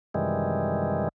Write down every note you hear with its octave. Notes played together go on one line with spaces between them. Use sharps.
F#2 C3 D#3 E3 G3 G#3